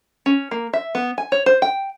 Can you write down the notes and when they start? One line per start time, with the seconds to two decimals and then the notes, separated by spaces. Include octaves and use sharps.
0.26 C#4
0.51 A#3
0.73 E5
0.95 B3
1.18 G#5
1.32 C#5
1.46 C5
1.62 G5